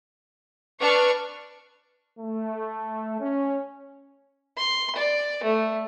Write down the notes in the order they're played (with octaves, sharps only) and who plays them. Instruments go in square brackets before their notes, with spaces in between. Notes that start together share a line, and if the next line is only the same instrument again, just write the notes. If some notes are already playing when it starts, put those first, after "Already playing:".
[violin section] D4 C#6 F6 [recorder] B4
[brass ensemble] A3
C#4
[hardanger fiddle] C6
D5
A3